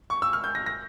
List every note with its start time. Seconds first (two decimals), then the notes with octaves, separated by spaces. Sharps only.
0.10 C#6
0.22 E6
0.33 F6
0.44 G6
0.55 A#6
0.66 A#6